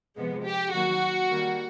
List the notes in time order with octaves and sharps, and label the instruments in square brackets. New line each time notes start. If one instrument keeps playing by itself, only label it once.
[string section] C3 F3 G#3 B3
G4
D#3 F#3 A#3 F#4
D#3 G3 A#3